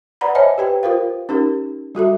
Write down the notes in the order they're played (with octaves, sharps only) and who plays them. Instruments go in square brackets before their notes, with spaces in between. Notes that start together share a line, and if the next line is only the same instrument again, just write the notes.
[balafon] B4 D5 F#5 A#5 B5
C5 C#5 D#5 E5 G#5 A5
G4 B4 G5
F4 A#4 C5 F5
C#4 D#4 G4 A#4
G3 F#4 A4 E5